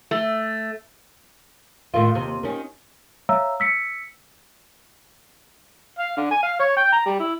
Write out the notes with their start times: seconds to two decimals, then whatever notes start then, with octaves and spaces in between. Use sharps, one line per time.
0.11 A3
1.94 A2 D#3 F4
2.15 D#2 C3
2.43 D#3 C#4
3.29 C#5 E5 F5 A#5 E6
3.60 E6 B6 C#7
5.99 F5
6.17 D3
6.31 G#5
6.43 F5
6.60 C#5
6.77 G5
6.93 A#5
7.06 G3
7.20 E4